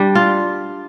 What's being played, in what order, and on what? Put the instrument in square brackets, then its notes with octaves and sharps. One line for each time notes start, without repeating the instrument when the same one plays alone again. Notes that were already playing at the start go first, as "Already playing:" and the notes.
Already playing: [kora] G3 D4
F4